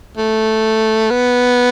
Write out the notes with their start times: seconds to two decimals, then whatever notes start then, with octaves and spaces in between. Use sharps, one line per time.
0.18 A3
1.10 B3